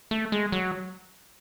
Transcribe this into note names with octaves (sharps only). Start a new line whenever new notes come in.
A3
G#3
F#3